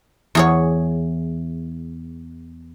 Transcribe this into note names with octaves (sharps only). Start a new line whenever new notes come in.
E2 G#4 C#5